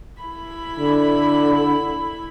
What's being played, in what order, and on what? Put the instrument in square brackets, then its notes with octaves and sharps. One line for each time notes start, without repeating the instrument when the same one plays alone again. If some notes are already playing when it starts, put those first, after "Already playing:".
[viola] E4 B5
[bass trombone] D3